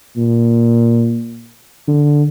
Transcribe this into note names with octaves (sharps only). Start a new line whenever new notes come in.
A#2
D3